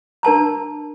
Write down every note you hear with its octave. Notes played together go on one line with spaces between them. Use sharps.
D4 A#4 A5 A#5